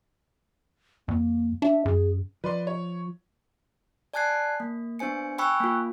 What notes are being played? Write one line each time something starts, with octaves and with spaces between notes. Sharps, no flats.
F2 A#3
D4 E5
F#2 G#4
F3 B4 D5 C6
C#5
D5 G#5 A5 F#6 G#6 C7
A#3
B3 D4 C5 G#5 C#7
G5 G#5 B5 C#6 E6 F#6
A#3 F4